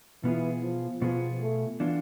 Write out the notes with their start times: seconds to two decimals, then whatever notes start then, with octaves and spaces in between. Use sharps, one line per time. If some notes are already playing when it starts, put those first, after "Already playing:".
0.24 B2 E3 B3 F4 G#4
0.63 F3
1.02 B2 F3 B3 F4 G#4
1.41 A3
1.80 E3 B3 D4 F4